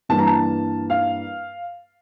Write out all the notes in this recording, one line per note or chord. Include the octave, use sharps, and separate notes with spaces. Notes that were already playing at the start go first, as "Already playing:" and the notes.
G2 E3 A#3 A5
A#5
A5
F5